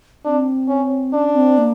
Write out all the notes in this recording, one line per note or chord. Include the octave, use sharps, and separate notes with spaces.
C4 D4
C#4
C#4 D4
C4
A#3